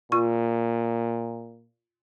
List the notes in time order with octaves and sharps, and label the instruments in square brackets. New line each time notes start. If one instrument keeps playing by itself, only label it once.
[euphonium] A#2 [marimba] F4 C#6